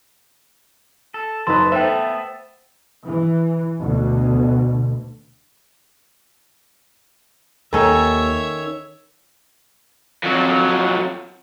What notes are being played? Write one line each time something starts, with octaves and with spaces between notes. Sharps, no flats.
A4
F#1 D#4 A4 B4 C6
A3 B3 A4 C5 E5 G5
E3
D2 B2
D#2 D#3 C#4 A4 C#5 E5
F2 F#3